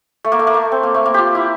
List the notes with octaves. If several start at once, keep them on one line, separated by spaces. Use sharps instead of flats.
A3
A#3
A3
A#3
A3
C4
A#3
A3
A#3
F4 G4
E4